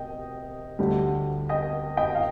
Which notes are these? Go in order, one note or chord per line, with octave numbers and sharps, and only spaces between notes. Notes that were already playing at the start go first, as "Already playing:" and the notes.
Already playing: C3 D#5 G5
D2 D3 G3
D#5 G5
D#5 G5
F5